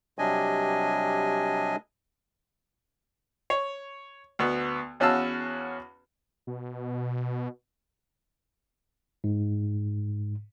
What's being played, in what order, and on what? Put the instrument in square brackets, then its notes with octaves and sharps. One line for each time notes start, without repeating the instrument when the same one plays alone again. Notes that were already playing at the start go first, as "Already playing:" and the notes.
[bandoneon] C3 F#3 G3 D4 D#5 G#5
[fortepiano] C#5
D2 B3
E2 C#4 F#4 F5 A5 E6
[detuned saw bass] B2
[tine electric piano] G#2